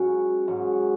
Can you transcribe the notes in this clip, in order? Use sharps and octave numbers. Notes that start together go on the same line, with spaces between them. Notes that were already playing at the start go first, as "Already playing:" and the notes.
Already playing: G#2 F#3 C#4 F#4
G#2 F#3 C#4 F#4